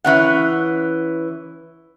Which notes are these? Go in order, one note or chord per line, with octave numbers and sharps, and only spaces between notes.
E3 C#4 F#5